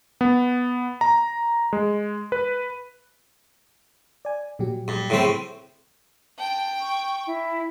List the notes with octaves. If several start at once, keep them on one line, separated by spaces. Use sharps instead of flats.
B3
A#5
G#3
B4
D5 G#5
A#2 F#3 G4
G2
A2 C#3 C4
G5 A5
C#6
E4